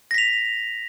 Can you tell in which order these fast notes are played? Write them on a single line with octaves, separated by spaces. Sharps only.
A#6 B6 F7